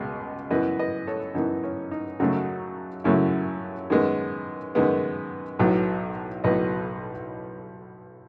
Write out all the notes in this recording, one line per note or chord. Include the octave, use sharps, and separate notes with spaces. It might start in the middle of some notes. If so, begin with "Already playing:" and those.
Already playing: C#2 B2 G#3
F#2 E3 B3 B4 D#5
B4 D#5
A4 C#5
F#2 E3 B3 D#4
C#4
D#4
F#2 C#3 F#3 A3 D#4 F#4
F#2 C#3 F#3 A3 C#4 E4
F#2 D#3 G#3 B3
F#2 D#3 G#3 B3
B1 A2 F#3 B3
B1 A2 F#3 B3 B4 D#5